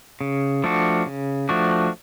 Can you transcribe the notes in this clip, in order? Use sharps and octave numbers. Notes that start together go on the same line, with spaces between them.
C#3
F3 A3 D4 F#4
C#3
F3 A3 D4 F#4